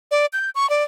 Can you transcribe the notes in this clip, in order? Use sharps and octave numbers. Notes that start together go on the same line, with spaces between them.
D5
G6
C#6
D5